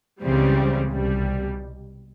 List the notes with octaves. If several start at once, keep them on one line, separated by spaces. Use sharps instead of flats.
C#2 C#3 E3 G3 C4
C2 B2 G3